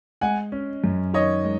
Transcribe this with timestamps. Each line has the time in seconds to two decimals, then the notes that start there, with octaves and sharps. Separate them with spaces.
0.21 G#3 F#5 G#5
0.52 C#4
0.84 F#2
1.14 D#3 C#5 D#5
1.44 G#3